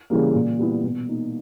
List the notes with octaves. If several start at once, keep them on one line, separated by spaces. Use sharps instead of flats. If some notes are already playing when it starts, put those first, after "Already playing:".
C#3 E3 G3 A#3
A#2
G3 B3 E4
B2
A#3 D#4